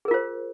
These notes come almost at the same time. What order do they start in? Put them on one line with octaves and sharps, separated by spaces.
G#4 A#4 F4 C5